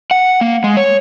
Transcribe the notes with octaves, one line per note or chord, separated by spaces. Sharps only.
F#5
A#3
G#3
C#5